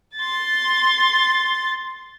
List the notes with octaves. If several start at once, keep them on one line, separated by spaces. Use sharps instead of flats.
C6 A6